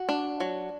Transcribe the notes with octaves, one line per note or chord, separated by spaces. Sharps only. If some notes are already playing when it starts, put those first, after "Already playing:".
Already playing: F#4
D4
F#3